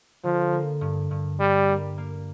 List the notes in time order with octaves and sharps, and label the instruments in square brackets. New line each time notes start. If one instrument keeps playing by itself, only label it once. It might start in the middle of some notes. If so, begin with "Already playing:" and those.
[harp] D3 [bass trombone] F3
[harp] A#3
G2
G2
[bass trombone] G3 [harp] D4
[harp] A#3
A#3